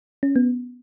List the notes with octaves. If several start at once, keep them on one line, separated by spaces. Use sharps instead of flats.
C#4
B3